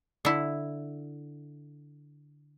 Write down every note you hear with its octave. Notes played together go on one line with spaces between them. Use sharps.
D3 E4